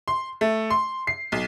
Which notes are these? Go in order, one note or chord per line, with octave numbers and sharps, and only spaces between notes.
C6
A3
C6
C7
B1